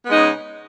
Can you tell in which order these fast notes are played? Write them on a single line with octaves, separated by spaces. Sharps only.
B3 G#3 D#4 C#3